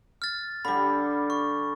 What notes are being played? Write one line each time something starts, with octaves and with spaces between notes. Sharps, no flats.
F6 A6
D3 G3 B5
C#6